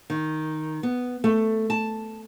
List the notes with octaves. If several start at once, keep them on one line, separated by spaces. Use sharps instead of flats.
D#3
B3
A3
A5